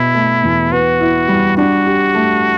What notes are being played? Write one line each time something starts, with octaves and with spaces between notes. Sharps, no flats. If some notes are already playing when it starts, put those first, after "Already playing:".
Already playing: B2 E4
A3
E2
B3 F#4
E4
G3
D4 F#4
G4
A3